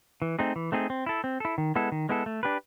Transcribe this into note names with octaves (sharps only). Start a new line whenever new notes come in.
E3
A3 C4 D#4 G#4
E3
A3 C4 D#4 G#4
C4
E4 A4
C4
E4 A4
D#3
G#3 B3 E4 A4
D#3
G#3 B3 E4 A4
A3
D4 G4 B4